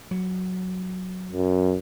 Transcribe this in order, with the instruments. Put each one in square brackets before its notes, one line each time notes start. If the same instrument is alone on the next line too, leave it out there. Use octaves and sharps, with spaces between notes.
[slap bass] F#3
[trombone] F#2